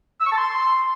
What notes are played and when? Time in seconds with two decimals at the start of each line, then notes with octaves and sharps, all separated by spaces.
0.21 E6
0.27 C#6
0.32 A5
0.38 C6